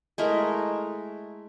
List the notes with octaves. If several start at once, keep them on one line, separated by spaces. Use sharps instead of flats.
G#3 A3 E4 A#4